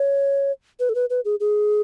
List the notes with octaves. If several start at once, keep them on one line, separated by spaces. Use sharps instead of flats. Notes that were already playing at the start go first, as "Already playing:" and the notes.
Already playing: C#5
B4
A4
B4
B4
G#4
G#4